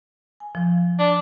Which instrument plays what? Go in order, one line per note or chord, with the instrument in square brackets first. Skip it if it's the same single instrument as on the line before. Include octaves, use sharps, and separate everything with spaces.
[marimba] G#5
F3
[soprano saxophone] D4